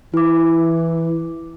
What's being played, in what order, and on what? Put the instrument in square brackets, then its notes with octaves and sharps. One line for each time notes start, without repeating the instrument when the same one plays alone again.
[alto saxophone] E3 [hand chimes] E4 D6